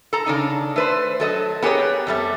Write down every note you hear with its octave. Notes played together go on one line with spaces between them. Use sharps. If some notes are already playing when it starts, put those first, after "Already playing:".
A4 A#5
C#3 D4 D#4
A3 B4 C5
F#3 A4 D#5
B3 G4 G#4 A#4 C#5
F2 G3 A3